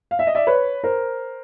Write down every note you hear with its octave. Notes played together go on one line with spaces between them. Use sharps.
F5
E5
D#5
D5 E5
B4 C#5
A#4 C5